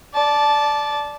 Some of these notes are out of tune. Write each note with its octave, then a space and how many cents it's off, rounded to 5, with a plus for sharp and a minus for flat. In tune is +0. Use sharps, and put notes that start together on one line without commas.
D5 +0 A5 -15